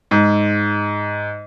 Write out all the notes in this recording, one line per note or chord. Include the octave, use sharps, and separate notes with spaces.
G#2